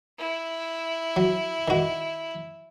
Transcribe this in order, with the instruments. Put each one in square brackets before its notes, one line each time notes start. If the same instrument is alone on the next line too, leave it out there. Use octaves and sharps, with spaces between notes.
[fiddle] E4
[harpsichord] F#3
D#3 F#4